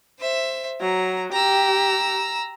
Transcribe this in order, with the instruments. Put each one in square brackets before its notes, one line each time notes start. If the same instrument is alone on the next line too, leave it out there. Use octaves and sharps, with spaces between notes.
[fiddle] C5 E5
[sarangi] F#3 [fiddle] A#5
[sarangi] G4 [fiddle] A#5 E6